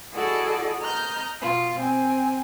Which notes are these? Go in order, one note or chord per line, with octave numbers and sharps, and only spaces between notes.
E4 F#4 G#4 A4 D5 D#5
D#5 A#5 F6 G6
B2 F4
C4 G#5